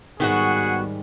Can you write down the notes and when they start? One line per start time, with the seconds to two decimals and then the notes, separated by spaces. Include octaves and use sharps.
0.20 G#2 D#3 G3 G#3 B3 F#4 G#4 F#5